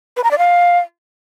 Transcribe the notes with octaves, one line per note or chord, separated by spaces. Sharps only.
B4
A#5
D5
F5